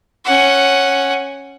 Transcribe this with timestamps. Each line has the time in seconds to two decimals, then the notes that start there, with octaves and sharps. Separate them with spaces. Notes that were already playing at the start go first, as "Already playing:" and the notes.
0.25 C#4 F#5